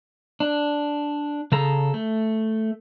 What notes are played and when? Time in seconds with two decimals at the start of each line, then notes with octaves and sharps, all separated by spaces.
0.40 D4
1.52 C#3 G#4 A4 A#5
1.94 A3